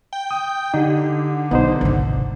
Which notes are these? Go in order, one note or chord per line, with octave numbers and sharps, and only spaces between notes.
G5
D#6
D3 D#4 G4
B1 B3 D#4 C5
G#1 C#2 C3